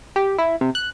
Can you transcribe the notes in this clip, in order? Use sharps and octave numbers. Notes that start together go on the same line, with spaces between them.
G4
E4
C3
F#6